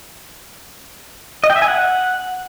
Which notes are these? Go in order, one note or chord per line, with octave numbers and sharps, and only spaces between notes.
D#5
G5
E5
G#5
F#5